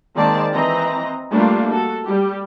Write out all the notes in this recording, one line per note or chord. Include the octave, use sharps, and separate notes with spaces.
D#3 G#3 A#3 C4 D5 A5
E3 C4 D#5 A#5
G3 A3 A#3 D4 F4
F#4 A4
G3 G4